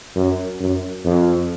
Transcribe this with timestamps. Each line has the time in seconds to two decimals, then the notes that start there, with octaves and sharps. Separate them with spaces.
0.16 F#2
0.60 F#2
1.05 F2